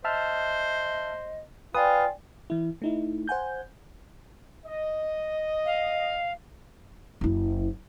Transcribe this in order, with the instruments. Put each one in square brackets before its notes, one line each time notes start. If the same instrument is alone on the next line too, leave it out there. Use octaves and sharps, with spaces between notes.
[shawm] C5 [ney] D#5 [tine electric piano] E5 A5 F6
[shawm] F4 [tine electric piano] B4 D#6 [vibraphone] D5 G5 G#5 [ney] F5
[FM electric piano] E3 E4
A3 D#4 E4
C5 F#5 G#5 G6
[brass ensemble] D#5
[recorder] F5
[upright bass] F#1 E4